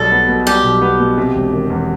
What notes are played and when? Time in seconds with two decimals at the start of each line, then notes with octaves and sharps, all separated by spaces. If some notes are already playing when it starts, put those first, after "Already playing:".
Already playing: B1 G3 A4
0.11 B3
0.28 B2
0.47 G3 G4
0.64 B1
0.82 B3
1.00 B2
1.18 C3
1.35 E1
1.53 D#3
1.70 E2